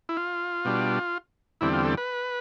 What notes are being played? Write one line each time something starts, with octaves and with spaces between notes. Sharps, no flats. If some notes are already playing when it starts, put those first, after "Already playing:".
E4
F4
B2 G3 D4
E2 D3 G3 C4 E4
F4
A4
B4